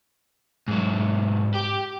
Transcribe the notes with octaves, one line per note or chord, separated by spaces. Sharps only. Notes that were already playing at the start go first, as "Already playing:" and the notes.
G#2 F#3
G4